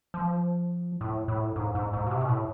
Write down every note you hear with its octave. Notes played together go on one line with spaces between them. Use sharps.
F3
A2
A2
G#2
G#2
G#2
B2
C3
B2
A2